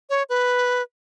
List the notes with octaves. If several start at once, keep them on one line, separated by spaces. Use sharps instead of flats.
C#5
B4